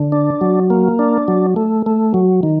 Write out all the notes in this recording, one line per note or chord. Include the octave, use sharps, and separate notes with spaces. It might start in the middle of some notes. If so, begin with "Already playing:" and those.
Already playing: D3
D4
F#3
A#3
D4
F#3
A3
A3
F#3
D#3